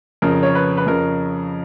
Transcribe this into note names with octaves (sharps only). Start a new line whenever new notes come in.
F2 C#3 A#4
C#5
B4
B4
F2 C#3 A#4